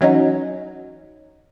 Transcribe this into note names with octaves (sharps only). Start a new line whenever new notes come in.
E3 F#3 C#4 D#4